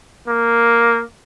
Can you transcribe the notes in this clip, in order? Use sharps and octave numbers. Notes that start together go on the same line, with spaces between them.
A#3